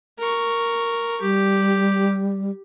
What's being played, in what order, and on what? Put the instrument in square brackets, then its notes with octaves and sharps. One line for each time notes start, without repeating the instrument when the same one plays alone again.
[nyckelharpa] A#4 C#6
[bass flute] G3 [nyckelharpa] G4